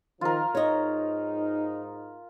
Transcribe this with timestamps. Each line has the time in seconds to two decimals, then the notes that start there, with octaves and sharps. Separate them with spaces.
0.21 D#3 F3 F4 A#4
0.55 G#2 D#4 C#5 D#5